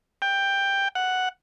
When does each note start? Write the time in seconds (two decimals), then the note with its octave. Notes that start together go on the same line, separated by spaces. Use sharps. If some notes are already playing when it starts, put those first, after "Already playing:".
0.22 G5
0.95 F#5